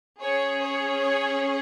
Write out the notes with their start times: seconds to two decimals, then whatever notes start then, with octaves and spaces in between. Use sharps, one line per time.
0.21 C#4 G#4 C#5
0.61 C#5
1.00 C#5